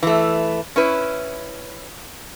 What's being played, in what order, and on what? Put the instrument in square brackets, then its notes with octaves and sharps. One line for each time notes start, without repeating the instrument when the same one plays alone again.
[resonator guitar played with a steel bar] E3 A3
C#4 E4 B4